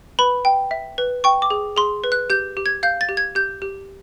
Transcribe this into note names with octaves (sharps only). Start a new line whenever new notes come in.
B4 B5
G5
E5
B4
G5 C#6
D6
G#4
G#4 C6
B4
F#6
G4 G6
G4
G#6
F5 G6
A6
G4
G#6
G4 G6
G4